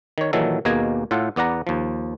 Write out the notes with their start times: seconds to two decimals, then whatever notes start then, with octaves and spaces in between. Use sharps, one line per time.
0.18 D#3 C#5
0.33 A#2 D#3 E3 F#3 A4
0.65 D#2 B2 A#3 G#4 D#5 G#5
1.11 A2 F4 A4 F#5
1.36 E2 B3 D5 F#5 A#5
1.67 D#2 F3